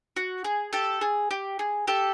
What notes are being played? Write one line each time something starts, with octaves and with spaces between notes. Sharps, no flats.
F#4
G#4
G4 A4
G#4
G4
G#4
G4 A4